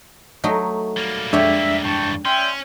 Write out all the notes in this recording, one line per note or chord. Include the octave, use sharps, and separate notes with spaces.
F#3 A3 D#4
G3 A#3
F2 G#3 D4 G4 C#5 E5 F#5
G2 E3 G5 A5 C#6
C#4 D5 E5 G5 C6